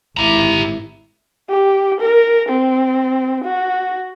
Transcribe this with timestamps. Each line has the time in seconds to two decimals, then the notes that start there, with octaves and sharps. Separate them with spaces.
0.17 G#1 E4 G4 A#5
1.50 G4
2.01 A#4
2.49 C4
3.44 F#4